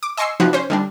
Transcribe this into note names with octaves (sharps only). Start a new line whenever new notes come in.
D6
D#5 G#5 C6 C#6 E6 C7
C3 F3 D#4 F#4 B4
C#4 C5
D3 G3 D4